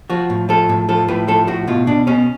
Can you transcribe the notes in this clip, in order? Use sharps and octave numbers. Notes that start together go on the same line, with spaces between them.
F3 F#4
A2
F3 A4
A2
F3 A4
A2 B4
F3 A4
A2 F#4
B2 F4
B2 D4
B2 C#4